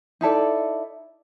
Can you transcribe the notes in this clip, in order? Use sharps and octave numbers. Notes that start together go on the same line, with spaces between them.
D#4 E4 A4 D5